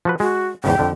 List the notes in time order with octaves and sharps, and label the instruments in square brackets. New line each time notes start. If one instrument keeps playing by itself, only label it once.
[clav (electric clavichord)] F3 F#4 B4
[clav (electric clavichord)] G#3 [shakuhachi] F#4
[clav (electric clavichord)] E2 G#2 C#3 [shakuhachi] G5
[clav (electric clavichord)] F2 D3 E5